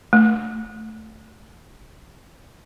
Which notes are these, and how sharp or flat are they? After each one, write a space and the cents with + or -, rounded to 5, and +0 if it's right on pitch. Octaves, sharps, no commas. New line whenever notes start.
A3 -5